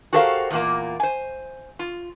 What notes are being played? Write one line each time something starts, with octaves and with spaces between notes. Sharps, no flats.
F#4 G4 A4 A#4 C5 F5
E2 A#2 A#3
C5 G#5
F4